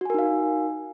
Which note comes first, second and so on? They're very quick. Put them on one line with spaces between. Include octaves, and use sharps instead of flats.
F#4 G#5 A#4 D#4 F5